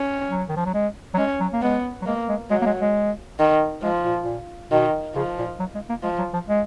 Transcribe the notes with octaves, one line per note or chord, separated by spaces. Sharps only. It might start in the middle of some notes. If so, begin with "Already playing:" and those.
Already playing: C#4
F#3
D#3
F3
F#3
G#3
F#3
G#3 C#4
F#3
A#3
G#3 B3
F#3
G#3 A#3
G#3
F#3 G#3
A#3
G#3
G#3
D#3
F3 G#3
A#2
A#2
B2 D#3
C#3 F3
A#2
F#3
G#3
A#3
F3 G#3
F#3
F3
G#3